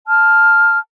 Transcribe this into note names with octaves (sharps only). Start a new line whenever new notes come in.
A5 F6